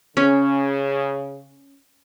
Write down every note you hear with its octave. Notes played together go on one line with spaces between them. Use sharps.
C#3 C#4